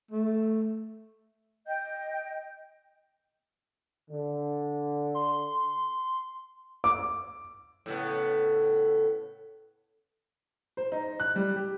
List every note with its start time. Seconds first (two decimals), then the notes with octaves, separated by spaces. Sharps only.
0.11 A3
1.67 D#5 G5 G6
4.11 D3
5.15 C6
6.84 D6
7.86 A2 C#3 B3
10.77 C5
10.92 D#4
11.20 F#6
11.36 G3
11.56 G4